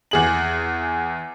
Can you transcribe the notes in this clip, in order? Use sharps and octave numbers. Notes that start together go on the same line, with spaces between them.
E2 G#4 F#7